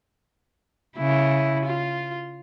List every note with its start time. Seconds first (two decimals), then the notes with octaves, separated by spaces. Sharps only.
0.98 C#3 E4
1.65 F4